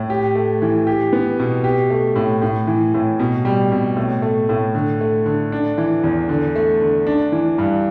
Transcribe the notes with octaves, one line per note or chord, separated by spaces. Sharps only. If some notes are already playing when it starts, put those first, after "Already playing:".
Already playing: A2
G4
A3
E3
G4
B3
B2
G4
A3
A2
A2
E3
A2
B2
G3
B2
A2
A3
A2
D3
A3
D3
D4
E3
E2
D3
A3
D3
D4
E3
G2